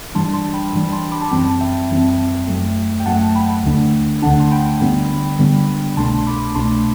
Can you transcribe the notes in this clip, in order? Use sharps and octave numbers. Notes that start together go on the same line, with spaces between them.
G2 E3 G3 D4 A5 C6
A5 C6
G5 B5
G2 E3 G3 D4
A5 C6
B5 D6
A5
F#2 E3 G3 C4 G5 B5
A5
E5 G5
F#2 E3 G3 C4
F#2 F#3 A3
G5
F#2 F#3 A3 F#5 A5
A5
G5 B5
D2 D3 A3 D4
D2 D3 A3 D4 F#5 A5
C6
G5 B5
G2 D3 G3 B3 D4
G2 D3 G3 B3 D4
C2 B2 A3 D4 A5 C6
C6
B5 D6
C2 B2 A3 D4 A5 C6